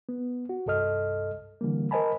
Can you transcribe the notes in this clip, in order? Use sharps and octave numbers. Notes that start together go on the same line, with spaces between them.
B3
F#4
C2 G2 A4 D#5 F6
D3 E3 G3 A#3
A#4 C5 D#5 G#5 A5 B5